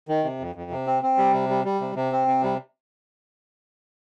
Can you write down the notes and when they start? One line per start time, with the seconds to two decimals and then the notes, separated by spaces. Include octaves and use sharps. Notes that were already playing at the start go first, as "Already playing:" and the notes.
0.08 D#3
0.24 C3
0.40 F2
0.55 F2
0.71 C3
0.87 C4
1.03 C4
1.18 G3
1.33 C3
1.49 G3
1.65 G3
1.81 C3
1.96 C3
2.12 C4
2.28 C3
2.43 G3